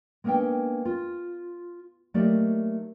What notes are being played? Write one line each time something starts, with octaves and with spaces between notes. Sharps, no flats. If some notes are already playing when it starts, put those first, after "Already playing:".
G#3 A#3 B3 C#4 D4 G5
F4
F#3 A3 A#3 D#4 G4 D5